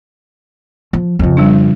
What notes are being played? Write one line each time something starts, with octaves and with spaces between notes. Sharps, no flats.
F3
F2 C#3
G3 D4